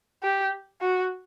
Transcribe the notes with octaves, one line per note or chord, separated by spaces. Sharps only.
G4
F#4